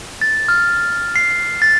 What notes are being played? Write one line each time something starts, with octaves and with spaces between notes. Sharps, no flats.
A6
F6
C7
A6